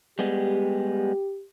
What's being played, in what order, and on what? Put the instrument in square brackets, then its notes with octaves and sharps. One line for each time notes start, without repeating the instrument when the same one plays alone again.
[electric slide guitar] G3 G#3 B3 [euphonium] G4